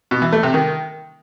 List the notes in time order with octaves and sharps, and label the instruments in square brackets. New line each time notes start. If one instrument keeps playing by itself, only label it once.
[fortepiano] B2
E3
A3
C3
D#3